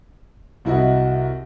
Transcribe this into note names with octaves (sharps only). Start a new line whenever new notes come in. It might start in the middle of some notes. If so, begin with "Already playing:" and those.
C2 E4 F#4 D#5